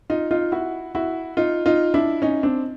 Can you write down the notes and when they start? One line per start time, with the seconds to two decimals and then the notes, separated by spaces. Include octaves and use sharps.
0.10 D#4 F4
0.31 D#4 F4
0.52 E4 F#4
0.95 E4 F#4
1.37 D#4 F4
1.66 D#4 F4
1.94 D4 E4
2.22 C#4 D#4
2.43 C4 D4